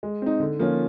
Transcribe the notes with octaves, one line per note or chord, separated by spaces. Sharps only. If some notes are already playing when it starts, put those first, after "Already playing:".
G#3
C4 D#4
D3
F3 A#3 C#4 F4